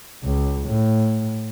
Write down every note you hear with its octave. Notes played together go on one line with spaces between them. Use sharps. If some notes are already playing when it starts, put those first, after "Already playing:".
C#2
A2